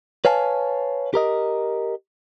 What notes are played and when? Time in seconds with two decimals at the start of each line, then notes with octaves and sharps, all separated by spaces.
0.25 B4 C#5 F5 G#5 A5
1.14 G4 A#4 D#5